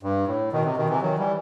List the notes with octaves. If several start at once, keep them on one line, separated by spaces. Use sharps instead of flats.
G2
A2
B2 D#3
C3
B2 D#3
C3 E3
D#3 F#3
E3 G3